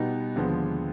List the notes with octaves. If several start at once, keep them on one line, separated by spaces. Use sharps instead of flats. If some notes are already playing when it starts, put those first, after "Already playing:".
Already playing: B2 G3 B3 D#4
D#2 D3 F3 G#3 B3